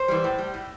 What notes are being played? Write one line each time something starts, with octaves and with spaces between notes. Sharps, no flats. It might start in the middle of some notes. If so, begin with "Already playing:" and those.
Already playing: C5
E3 G3
A2
G3
A2